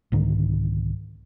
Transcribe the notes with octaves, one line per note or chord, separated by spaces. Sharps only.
C2 G#2 D3 D#3